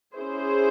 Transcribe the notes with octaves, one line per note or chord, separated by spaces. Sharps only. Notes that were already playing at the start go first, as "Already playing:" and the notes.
C#4 E4 G#4 C5